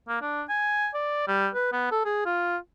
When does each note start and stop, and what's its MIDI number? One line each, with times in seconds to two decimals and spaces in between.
0.08 0.19 58
0.22 0.43 62
0.49 0.88 80
0.94 1.25 74
1.28 1.48 55
1.54 1.68 71
1.73 1.91 59
1.92 2.01 69
2.05 2.21 68
2.26 2.57 65